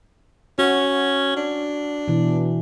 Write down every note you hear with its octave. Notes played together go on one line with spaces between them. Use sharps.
C#4 F#4
D4
B2 E3